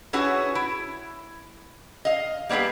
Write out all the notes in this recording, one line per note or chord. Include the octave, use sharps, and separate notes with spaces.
C#4 E4 F#4 G#4 B4 C#5
E4
D#5 F5
G3 A#3 B3 G4 G#4